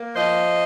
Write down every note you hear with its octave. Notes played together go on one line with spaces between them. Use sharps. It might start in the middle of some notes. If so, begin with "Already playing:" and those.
Already playing: A#3
F3 C5 D#5